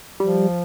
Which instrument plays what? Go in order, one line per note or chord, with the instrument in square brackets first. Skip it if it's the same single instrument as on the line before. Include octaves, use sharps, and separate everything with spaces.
[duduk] F3 [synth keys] G3